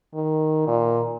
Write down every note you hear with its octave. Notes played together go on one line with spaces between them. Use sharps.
D#3
A#2